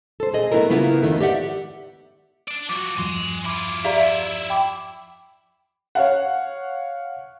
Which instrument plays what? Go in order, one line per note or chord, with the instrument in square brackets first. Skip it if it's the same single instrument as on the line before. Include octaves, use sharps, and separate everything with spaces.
[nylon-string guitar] A4 C5
A#2 G#4 D#5
A3 B3 C4 E4 A4 A#4
C#3 A#3 B3 E4 F4
F2 D#3 A3 B3
G4 D5 E5 F#5
[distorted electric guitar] D5 A5
[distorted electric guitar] F3 F#4 [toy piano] D6
[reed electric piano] E2 G2 F3 [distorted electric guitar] G#5 C6
[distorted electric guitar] E4 F4 [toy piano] B5 D6
[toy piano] G4 D5 F5 [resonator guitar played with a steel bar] E5 A#5
[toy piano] G5 B5 D6
[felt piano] C#5 F5 F#5